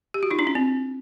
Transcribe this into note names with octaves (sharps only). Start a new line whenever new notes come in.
G4
F#4
D#4 F4
D4 E4
C#4
C4